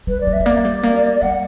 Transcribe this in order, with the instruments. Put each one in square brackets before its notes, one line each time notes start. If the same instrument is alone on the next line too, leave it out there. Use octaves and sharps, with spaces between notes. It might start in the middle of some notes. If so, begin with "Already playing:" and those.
[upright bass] G3 [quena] B4
[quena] D5
[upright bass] G3
[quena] E5
[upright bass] G3
[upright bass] A#3 [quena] D5
[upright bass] G3
A#3
[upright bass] G3 [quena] F#5